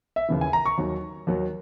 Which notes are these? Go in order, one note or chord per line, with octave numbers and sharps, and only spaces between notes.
E5
D#2 C#3 E3
G#5
A#5
C#6
D#2 D#3 F#3
D#2 D#3 F#3